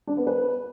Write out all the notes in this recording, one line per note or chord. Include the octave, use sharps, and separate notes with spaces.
D4
B3
B4